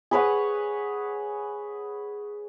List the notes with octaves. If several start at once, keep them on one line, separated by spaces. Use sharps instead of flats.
G#4 B4 C#5 F#5